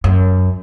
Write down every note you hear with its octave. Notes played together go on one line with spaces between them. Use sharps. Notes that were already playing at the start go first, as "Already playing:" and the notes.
F#2